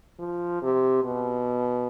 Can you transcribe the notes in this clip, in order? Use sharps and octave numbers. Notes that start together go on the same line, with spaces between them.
F3
C3
B2